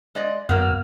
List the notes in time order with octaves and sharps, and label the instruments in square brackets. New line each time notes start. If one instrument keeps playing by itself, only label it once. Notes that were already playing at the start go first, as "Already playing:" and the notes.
[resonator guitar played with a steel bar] G#3 D5 D#5
[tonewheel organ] F#2 F6 [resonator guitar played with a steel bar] F#3 A#3 B3